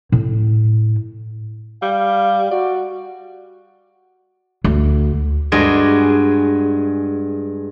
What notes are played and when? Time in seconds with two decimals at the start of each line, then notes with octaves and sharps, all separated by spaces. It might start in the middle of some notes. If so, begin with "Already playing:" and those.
0.12 A2 E4
1.82 G3 F5
2.51 F#4 D5
4.64 D2
5.52 G2 G#3 F#4 G#4